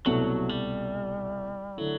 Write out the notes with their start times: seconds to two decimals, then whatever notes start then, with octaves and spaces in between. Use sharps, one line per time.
0.06 C2 B2 F#3 A3
0.49 G3
1.78 D3 F#3 A3 E4